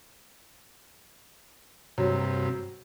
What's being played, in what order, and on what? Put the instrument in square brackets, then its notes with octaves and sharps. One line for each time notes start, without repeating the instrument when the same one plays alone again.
[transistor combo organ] G2 C3 [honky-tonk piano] F#3